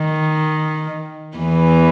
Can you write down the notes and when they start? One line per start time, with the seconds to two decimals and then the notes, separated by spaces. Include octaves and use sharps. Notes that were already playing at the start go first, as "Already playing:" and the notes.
Already playing: D#3
1.37 E2 E3